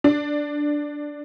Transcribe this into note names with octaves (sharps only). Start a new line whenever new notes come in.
D4